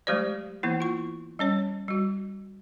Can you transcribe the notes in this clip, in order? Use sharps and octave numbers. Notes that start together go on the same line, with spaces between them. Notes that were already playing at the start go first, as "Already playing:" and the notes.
F#3 G#3 A3 G4 C5 D5
E3 A#3 B3 E4
F4 C#6
G3 C#4 C#5
G3 F#4